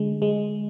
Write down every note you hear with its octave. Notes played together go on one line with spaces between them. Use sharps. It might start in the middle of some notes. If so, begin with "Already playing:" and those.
Already playing: D3 G#3
G#3